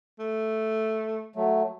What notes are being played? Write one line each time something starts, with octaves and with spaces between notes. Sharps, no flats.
A3
F#3 A3